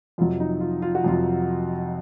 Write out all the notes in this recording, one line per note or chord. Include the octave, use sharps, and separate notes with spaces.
F2 C3 F#3 F4
D#4
F4
F4
F#4
F2 C3 F#3 F4